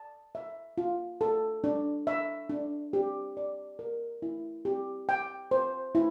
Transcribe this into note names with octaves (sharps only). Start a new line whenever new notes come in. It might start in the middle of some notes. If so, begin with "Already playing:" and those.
Already playing: A5
E5
F4
A4
D4
E5
D4
G4
D5
A#4
E4
G4
G5
C5
E4